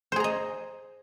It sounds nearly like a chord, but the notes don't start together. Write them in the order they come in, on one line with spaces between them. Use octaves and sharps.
C5 G#4 A#5 D#5